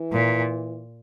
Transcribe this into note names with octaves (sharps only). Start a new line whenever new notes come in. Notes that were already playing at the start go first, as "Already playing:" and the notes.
Already playing: E3
A#2